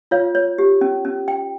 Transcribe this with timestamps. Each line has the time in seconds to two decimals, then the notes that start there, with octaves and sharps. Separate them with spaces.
0.11 F4 C#5 F5
0.35 C#5
0.58 G4
0.81 C#4
1.05 C#4
1.28 G5